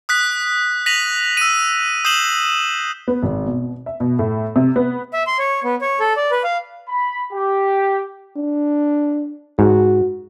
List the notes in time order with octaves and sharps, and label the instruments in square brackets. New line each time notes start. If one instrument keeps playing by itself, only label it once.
[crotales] D#6 F#6 B6
A#6 B6 D#7 F7 F#7
E6 D#7
D#6 G6 C7 E7 F#7 G7
[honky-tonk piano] B3
G#1
B2
E5
B2
A2
C3
B3
[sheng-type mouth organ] E5
C6
C#5
B3
C#5
A4
D5
B4
F5
[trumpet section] B5
G4
[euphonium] D4
[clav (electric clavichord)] G#2 [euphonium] F#4